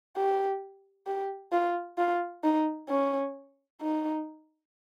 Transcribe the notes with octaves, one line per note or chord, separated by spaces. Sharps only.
G4
G4
F4
F4
D#4
C#4
D#4